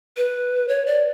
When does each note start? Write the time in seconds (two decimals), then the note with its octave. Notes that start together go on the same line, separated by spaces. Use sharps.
0.17 B4
0.68 C#5
0.86 D5